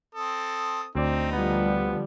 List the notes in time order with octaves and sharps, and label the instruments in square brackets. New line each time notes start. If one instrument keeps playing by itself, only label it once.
[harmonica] C4 A4 D#6
[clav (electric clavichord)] D2 D5 [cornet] C4 [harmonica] D#4
[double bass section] D3 F3 G3 [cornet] B3